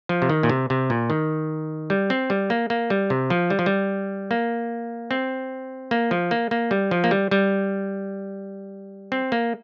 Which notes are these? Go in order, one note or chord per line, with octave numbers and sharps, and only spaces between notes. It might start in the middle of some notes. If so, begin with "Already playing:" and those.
F3
C3
D#3
A#2
C3
C3
A#2
D#3
G3
C4
G3
A#3
A#3
G3
C3
F3
G3
F3
G3
A#3
C4
A#3
F3
A#3
A#3
G3
F3
A#3
G3
G3
C4
A#3